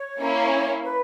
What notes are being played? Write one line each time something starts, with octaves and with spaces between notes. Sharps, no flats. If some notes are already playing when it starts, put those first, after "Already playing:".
Already playing: C#5
A#3 C#4 E4
B4